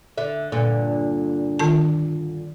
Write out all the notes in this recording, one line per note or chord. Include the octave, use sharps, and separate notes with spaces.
D3 E5
G2 A#2 D3
D#3 F4 A5